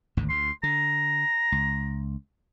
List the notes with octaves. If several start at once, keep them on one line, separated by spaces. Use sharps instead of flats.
G#1 D2 G#2
D2 C6
D3 A#5
C#2